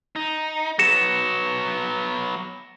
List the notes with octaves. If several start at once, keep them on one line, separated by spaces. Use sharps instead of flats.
D#4
F#3 B3 A#6 C#7 E7